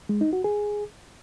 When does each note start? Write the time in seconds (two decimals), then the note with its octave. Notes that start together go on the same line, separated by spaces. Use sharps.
0.09 G#3
0.21 D#4
0.33 F#4
0.44 G#4